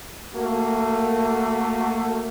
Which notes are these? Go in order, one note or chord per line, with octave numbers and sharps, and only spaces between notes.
A3 A#3 F#4